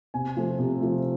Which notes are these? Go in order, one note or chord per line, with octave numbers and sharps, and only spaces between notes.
C3 G#5
F3 A3
C3
F3 A3